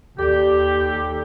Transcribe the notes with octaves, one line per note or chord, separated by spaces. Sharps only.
D#2 G4 A4 D5